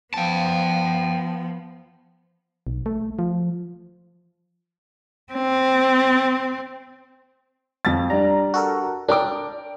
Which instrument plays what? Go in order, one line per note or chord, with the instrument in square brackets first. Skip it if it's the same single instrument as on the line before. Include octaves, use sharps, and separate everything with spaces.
[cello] F3 B3 [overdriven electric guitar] G5 A5
[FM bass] B1
A3
F3
[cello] C4
[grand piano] F2 A6
[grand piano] G3 D4 [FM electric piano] A#5
[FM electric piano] F#4 A4 A#4
[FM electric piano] D4 [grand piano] A#4 G5 D6